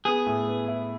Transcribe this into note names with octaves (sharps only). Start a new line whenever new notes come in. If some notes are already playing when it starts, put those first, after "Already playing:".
B3 G#4
A2
B3
E4